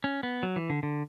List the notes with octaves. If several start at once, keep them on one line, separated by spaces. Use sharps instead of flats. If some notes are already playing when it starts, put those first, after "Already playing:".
C#4
B3
F#3
E3
D3
D3